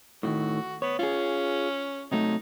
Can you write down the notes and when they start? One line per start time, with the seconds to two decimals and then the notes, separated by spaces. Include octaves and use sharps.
0.23 A2 C3 D#3 F#4
0.82 B3 C#5
0.99 C#4 F4 G#4
2.12 C3 F#3 A3 D#4